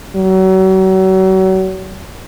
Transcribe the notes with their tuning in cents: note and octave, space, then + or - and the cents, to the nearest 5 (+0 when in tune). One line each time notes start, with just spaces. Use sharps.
F#3 +35